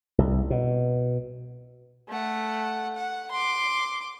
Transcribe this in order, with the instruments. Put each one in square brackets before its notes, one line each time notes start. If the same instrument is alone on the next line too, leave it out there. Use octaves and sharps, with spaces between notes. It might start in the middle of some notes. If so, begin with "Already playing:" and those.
[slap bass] C2
B2
[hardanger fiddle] A3 F#5
F#5
C6 D6